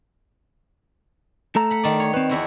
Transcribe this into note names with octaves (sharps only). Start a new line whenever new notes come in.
A3 A4 A#5
F#5 B5
D#3 D5
C#5
C4 B4
E2 E4 F#4